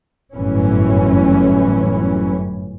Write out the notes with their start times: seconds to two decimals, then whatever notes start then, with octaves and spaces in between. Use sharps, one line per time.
0.33 G1 F#2 A2 E3 C#4